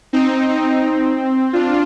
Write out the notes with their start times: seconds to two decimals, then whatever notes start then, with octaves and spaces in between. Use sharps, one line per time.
0.13 C4 D#4
0.49 C4 D#4
0.84 C4
1.53 D4 F4